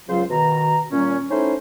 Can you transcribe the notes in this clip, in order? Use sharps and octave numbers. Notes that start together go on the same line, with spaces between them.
C#2 C#3 F#3 F4 C5 F5
B2 D#3 A#5
A#2 G3 C#4
A3 C#4 D#4 E4 C5